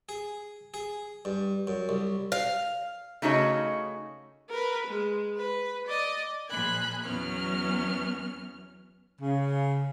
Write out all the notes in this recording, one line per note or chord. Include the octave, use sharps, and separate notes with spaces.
G#4
G#4
G2
F#2
C2
F5
C#3 A3 D#4 F#4 C#5 D#5
A#4 B4
G#3
B4
D5 D#5
A#2 F3 G#4 B5 F#6 G#6
E2 F#3 B3 C#4 F6
C#3